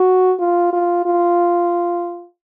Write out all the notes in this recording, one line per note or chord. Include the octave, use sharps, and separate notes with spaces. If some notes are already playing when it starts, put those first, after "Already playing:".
Already playing: F#4
F4
F4
F4